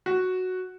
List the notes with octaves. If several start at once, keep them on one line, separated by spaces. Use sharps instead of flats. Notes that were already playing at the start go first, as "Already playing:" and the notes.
F#4